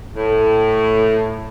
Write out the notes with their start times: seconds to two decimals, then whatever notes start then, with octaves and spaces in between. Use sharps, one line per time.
0.16 A2